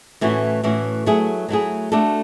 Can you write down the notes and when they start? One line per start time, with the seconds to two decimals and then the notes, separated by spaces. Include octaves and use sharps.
0.21 A2 E3 A3 C#4 F#4
0.64 A2 E3 A3 C#4 F#4
1.06 F#3 A3 E4 G#4
1.48 F#3 A3 E4 G#4
1.92 A3 D4 F#4 A4